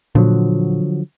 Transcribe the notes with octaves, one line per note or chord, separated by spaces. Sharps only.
A#2 D3 F3 F#3